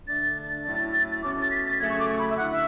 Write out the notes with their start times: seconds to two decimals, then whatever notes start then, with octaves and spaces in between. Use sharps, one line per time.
0.07 D3 A3 D4 A6
0.65 A2 F#3 C#4 E4 A6
1.23 B2 A3 C#4 D6
1.42 A6
1.51 B6
1.65 A6
1.79 C#3 F#3 A3 G#6
1.90 C#6
1.99 D6
2.09 C#6
2.19 B5
2.30 E5
2.37 D3 A3 E4 F#5
2.52 E5